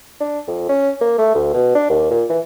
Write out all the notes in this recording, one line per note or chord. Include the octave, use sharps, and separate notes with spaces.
D4
F2
C#4
A#3
A3
D2
B2
D4
D#2
A#2
E3